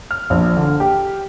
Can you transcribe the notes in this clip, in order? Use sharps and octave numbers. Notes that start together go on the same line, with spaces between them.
F6
A#1
D3
G4